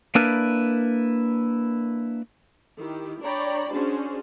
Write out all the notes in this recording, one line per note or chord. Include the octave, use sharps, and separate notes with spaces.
A#3 D4 E4 A#4 B4 D5
D#3 E4 G4
D4 C#5 D5 G5 A#5 B5
C#4 D4 F#4 G#4 C5